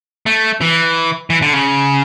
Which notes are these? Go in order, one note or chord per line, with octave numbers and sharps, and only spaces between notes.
A3
E3
E3
D3
C#3